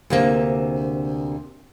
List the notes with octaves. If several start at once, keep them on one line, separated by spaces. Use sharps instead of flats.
D2 C3 A#3